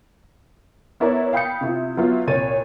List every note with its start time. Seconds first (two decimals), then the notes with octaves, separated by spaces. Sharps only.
1.00 B3 E4 A#4 C#5 D5 A#5
1.33 F5 G5 B5 D#6 G6 C#7
1.61 C3 E4 F4
1.97 F#3 B3 E4 F4
2.27 C2 A#2 C#5 A6 D#7